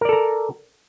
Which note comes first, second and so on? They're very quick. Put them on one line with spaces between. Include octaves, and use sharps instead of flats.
A#4 D5 A4 A#5